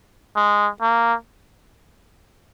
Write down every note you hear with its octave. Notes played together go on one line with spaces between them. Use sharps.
G#3
A#3